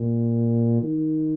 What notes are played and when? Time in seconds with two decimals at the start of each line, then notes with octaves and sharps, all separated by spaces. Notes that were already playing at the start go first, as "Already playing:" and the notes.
Already playing: A#2
0.83 D#3